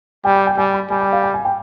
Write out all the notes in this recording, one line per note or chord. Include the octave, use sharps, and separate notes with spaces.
G3 G5
G5
G5
G3 G#5
B5
G3 G#5
G5
F5
G5
G#5
G5